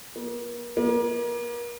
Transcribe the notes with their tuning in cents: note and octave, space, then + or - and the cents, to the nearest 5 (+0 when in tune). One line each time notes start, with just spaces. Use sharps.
A#3 +40
A#3 +35